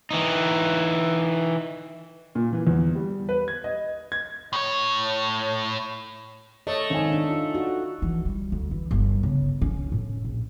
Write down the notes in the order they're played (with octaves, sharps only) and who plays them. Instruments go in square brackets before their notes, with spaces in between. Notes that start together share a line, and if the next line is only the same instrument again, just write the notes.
[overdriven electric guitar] E3 D#4
[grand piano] A#2
E3
E2
G3
B4
G#6
D#5
G#6
[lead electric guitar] A2 C#5
[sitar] A3 [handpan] C#5 D#5
[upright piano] G#1 G#5
[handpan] D4 D#4
[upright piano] F4
[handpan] F#4
[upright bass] E3
G3
D2
E3
G1
C#3
C#4
A2
A#1